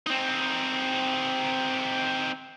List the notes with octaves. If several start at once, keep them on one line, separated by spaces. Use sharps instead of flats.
C4 D#4